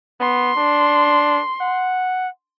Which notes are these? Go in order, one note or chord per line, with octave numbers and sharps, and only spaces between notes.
B3 C6
D4
F#5